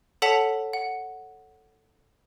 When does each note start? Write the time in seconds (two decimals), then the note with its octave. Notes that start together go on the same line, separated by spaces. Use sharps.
0.22 A4 C#5 F#5 A5 B6 F7
0.73 F#5